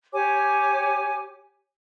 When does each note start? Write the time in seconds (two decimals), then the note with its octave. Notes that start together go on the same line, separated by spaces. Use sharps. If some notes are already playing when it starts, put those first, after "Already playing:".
0.12 G4 C#5 G#5 D6